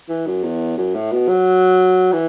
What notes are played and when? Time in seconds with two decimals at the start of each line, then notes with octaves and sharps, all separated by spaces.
0.09 E3
0.26 F#2
0.43 E2
0.78 F#2
0.95 A2
1.12 B2
1.28 F#3
2.13 E3